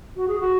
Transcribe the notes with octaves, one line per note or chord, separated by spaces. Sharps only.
F#4
G#4
F#4